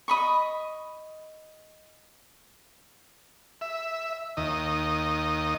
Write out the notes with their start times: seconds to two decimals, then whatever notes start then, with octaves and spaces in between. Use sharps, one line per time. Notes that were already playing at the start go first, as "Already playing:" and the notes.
0.08 D#5 B5 C#6
3.61 E5
4.37 D#2 D#5